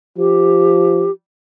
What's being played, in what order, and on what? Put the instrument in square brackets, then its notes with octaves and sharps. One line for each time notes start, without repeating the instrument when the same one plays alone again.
[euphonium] F3 [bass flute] G4